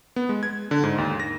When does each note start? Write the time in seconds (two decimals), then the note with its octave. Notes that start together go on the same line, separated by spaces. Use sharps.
0.16 B3
0.29 G#3
0.43 G#6
0.71 D3
0.84 G#2
0.98 D#2
1.20 A#6